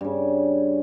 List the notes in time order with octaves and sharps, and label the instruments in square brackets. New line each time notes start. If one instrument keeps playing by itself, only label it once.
[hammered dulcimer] G2 C#3